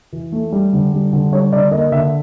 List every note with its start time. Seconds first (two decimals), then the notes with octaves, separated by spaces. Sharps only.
0.13 E3
0.32 A3
0.52 G3
0.73 D3
0.93 G3
1.13 D3
1.32 G3 C#5
1.52 D3 D5
1.71 A#3 D#5
1.92 D3 E5